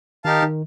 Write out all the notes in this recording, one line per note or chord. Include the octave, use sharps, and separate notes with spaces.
D#3 D#4 G4 A#4 F5 A5
D#3